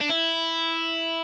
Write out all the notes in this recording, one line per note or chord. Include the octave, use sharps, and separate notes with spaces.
D4
E4